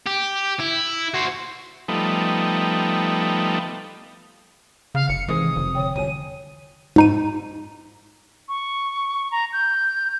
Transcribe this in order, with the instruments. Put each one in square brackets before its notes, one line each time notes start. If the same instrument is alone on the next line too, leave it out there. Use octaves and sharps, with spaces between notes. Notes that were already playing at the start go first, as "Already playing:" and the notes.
[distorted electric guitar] G4
E4
F#4 C5
[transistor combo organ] F3 G3 A3 B3 D#4
[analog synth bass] C#3 [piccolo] F5
[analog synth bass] F#1 [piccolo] C#7
[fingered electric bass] C3 D#3 G#3 [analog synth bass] E3 [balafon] C5 [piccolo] D#6
[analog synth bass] F#1 [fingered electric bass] F2 C3
[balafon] D3 C#5 G5
[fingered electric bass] E1 C2 F2 [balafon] C#5 G#5 [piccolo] D#7
[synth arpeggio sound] G#2 D#4 D#7
[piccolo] C#6
A#5
G6